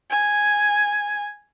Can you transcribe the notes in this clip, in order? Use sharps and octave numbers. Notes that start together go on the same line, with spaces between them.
G#5